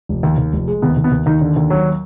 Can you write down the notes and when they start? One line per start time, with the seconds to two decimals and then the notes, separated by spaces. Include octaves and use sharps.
0.09 F1
0.23 D#2
0.38 D#2
0.53 F1
0.68 G#3
0.82 D#2 B3
0.97 D#2
1.04 B3
1.11 D#2
1.26 D#2 D#4
1.41 D3
1.56 D#2
1.70 F#3